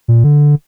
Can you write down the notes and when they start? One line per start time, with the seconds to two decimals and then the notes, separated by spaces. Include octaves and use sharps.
0.08 A#2
0.24 D3